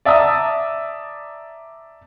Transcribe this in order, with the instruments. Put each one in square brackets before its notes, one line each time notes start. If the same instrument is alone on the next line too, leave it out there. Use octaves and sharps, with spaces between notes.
[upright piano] D5 E5 A5 A#5 D#6